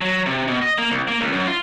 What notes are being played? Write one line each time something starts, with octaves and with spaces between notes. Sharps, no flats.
F#3
C3
B2
D#5
A#3
C2
A#3
C#2
F#2
F4